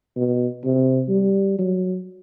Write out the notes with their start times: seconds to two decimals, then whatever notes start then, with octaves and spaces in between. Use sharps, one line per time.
0.16 B2
0.65 C3
1.09 G3
1.59 F#3